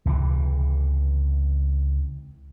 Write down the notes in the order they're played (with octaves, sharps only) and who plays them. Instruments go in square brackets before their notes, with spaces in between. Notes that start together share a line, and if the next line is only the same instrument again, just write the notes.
[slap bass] C#2 C3 D#3 E3